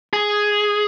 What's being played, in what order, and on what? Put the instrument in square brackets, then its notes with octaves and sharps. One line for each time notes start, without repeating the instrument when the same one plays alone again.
[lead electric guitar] G#4